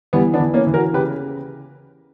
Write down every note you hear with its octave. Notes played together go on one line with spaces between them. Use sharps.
E3 G3 B3
B3 D4
E3
A#3 C#4
E3
F#4 A#4
C#3 G4 B4